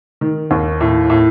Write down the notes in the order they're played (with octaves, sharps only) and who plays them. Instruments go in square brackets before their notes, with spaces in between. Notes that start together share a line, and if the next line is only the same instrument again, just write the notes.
[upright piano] D#3
D#2
A2
A2